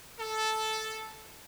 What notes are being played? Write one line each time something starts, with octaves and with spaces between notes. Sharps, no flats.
A4